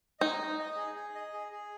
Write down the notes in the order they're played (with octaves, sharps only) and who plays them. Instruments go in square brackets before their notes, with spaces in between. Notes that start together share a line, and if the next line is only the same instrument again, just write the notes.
[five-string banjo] D#4 [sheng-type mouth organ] D#5
[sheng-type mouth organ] D#5
D#5
G#4
G#4
D#5
G#4
G#4